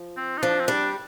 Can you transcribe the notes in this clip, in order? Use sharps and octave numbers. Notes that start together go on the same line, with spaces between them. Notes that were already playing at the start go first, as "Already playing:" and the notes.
Already playing: F3
C4
D#4
F3 D4
C4
G3 D4